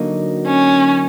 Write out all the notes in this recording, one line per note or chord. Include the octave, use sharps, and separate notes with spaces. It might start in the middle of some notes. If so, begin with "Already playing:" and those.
Already playing: D3 F#3 A#3 D#4 F#4
C#4